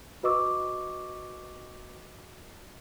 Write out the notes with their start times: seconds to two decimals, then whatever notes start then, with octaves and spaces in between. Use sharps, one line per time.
0.23 F#4 B4 D#5 C#6 D6 E6